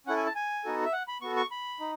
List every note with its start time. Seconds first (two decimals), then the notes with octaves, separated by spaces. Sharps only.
0.07 C#4 E4 A4 F#5
0.16 G#5
0.26 A5
0.35 G#5
0.65 B3 D#4 F#4 A4
0.85 E5
0.93 F#5
1.08 B5
1.22 B3 F#4 A4 C#6
1.36 C#6
1.51 B5
1.80 D#4